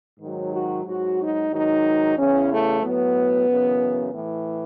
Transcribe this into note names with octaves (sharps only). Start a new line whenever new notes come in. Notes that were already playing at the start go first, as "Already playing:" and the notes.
G#2 D#3 F#3
F#4
G#2 F#3 F#4
D#4
G#2 D#3 F#3 D#4
E2 C#3 E3 C#4
A3
A2 F#3 B3
F#2 C#3 E3
A2 E3